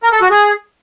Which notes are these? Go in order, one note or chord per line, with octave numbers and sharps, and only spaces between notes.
A#4
A4
F#4
G#4